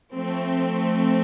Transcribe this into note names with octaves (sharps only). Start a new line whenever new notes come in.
F3 A3 C4